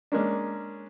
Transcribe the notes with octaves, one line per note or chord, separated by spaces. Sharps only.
G#3 A#3 C#4 D4